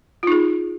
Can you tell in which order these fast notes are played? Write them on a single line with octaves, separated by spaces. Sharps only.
F4 D#4 G#4